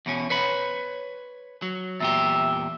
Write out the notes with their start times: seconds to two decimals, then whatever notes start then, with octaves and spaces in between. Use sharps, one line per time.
0.06 E2 B2 C#4
0.30 B4 C#5 B5
1.62 F#3
2.00 E2 A#2 G4 E5